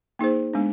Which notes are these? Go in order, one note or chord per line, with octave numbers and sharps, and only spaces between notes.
A#3 D#4 G#4 C5
G#3 B3 D4